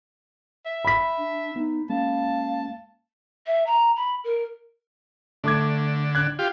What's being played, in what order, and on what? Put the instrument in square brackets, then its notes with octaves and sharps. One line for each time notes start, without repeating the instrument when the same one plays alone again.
[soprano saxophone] E5
[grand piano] B5 B6
[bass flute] D4
[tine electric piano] B3 [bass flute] D#4
[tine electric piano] G#3 A#3 C#4 [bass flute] F5 [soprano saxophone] A5
[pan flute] E5
A#5
B5
A#4
[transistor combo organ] D3 [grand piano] A3 D6 G#6
[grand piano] F#6 G#6
[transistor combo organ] F4 G4